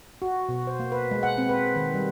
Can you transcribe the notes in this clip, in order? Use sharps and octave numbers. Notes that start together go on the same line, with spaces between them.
F#4
B2
C5
A#3
B4
G#3
F#5
C4
B4
D#3
G3